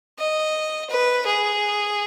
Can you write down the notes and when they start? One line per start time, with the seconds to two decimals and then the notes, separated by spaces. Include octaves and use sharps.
0.19 D#5
0.90 B4
1.26 G#4